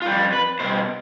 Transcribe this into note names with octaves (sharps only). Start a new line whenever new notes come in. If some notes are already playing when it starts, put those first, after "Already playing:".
F4
F2 E3 G3 G4
B4
B2 G3 C5